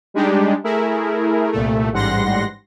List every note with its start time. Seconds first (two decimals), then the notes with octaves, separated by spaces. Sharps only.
0.14 G3 G#3 D4 D#4 G4
0.64 A3 E4 G#4 A#4
1.52 C2 A#2 A3
1.92 A1 G#2 G3 F#5 C6 A#6